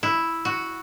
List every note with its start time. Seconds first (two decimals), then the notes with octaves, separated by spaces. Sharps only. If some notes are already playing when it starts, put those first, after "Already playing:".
0.03 E4
0.45 F#4